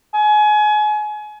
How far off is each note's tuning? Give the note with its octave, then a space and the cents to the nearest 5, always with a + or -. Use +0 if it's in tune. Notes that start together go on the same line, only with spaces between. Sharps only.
G#5 +30